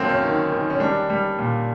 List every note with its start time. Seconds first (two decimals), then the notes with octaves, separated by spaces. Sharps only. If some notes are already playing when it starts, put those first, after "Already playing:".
Already playing: F#2 F#3 A3 A#3 C4
0.09 C#4
0.23 D#3
0.52 D#3
0.70 C#4
0.80 G3 D4
1.10 G3
1.39 A#2